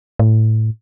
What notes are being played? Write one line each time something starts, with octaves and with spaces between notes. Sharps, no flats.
A2